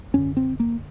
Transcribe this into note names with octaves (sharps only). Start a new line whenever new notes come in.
F#2 D3 C#4
C4
A#3